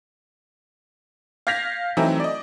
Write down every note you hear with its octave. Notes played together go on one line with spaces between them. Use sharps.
F5 G6 G#6 A#6 B6 F7
E3 F#3 A3 C4 D#4 E4
D5 D#5